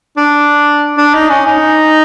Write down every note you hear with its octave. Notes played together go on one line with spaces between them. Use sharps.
D4
D4
D#4
C#4
D#4